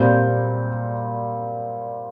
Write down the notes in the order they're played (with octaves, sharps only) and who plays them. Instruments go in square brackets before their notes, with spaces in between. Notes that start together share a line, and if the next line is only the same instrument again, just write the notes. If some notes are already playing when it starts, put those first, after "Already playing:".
Already playing: [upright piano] A#2 G3 C4 G6